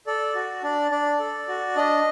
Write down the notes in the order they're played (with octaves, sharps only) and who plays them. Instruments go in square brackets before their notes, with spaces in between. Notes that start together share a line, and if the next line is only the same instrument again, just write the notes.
[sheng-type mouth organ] A4 D5
F#4
D4 D5
D4 D5
A4
F#4
D4 D#5